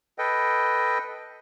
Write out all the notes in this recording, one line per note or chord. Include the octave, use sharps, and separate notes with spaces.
A4 B4 D#5 G5